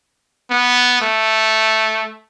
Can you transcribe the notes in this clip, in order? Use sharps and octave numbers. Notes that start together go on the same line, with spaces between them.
B3
A3